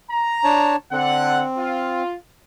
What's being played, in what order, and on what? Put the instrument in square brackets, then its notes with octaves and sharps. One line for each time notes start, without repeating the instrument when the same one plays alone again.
[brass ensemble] A#5
[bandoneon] D4 C#5 A5
[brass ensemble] D3 F#5 [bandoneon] C4
[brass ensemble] F4